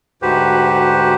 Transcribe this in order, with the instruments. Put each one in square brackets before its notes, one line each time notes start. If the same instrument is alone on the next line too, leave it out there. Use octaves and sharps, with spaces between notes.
[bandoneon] D2 G#2 F#4 G4 B4 C5